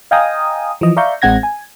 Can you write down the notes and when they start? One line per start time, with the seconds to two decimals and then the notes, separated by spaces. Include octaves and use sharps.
0.11 D#5 F5 G5 G#5 A#5 D#6
0.81 E3 F3 D#5
0.97 D5 E5 F5 A#5 C#6 G6
1.22 A1 G#3 C4 F#5 G#6 A#6
1.43 G#5